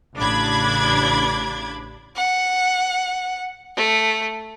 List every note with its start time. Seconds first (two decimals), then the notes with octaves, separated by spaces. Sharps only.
0.17 A1 C#3 D4 B5 D6 G#6
2.16 F#5
3.76 A3